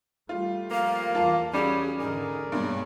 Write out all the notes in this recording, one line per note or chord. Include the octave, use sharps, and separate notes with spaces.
G3 A3 F4
F3 A#3 F5
E2 F4 A5
F#3 G3 C#4 G#4
G#2 D3 D#4 G#4 A#4 D5
G2 B2 G#3 A#3 C#5